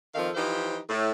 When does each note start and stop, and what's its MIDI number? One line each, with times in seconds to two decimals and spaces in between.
0.15 0.30 41
0.15 0.30 51
0.15 0.30 53
0.15 0.30 69
0.15 0.30 77
0.35 0.78 52
0.35 0.78 53
0.35 0.78 63
0.35 0.78 67
0.35 0.78 72
0.89 1.12 45